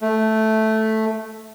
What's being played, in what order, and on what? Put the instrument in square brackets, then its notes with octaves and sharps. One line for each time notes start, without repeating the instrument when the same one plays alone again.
[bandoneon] A3